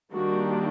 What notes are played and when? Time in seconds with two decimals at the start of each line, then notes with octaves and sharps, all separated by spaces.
0.13 D#3 G3 A#3 D4 F#4